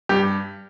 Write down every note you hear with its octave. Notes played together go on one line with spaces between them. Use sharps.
G2 G4